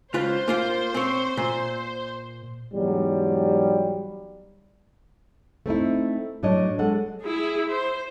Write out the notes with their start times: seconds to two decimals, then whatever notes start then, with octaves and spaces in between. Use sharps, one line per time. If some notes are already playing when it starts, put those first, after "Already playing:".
0.14 C#2 F4 B4 C5
0.48 A#3 F4 F5
0.94 C4 C#5
1.37 A#2
2.73 E2 G#2 F#3 G3
5.66 A3 C4 D#4 E4
6.43 A2 F#3 D4 C#5 D#5
6.79 G#3 A4 F#5
7.22 E4 G#4
7.69 C5